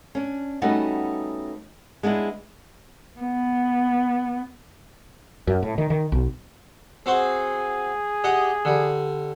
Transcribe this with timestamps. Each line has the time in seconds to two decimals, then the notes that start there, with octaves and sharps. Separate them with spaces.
0.15 C#4 D4
0.62 G3 A3 B3 C#4 D#4 F#4
2.03 G#3 B3 D4 E4
3.20 B3
5.47 F#2
5.63 A2
5.78 D#3
5.90 D#3
6.12 B1
7.06 C4 F#4 G#4 C5
8.24 G4 D#5 F#5
8.65 D3 G3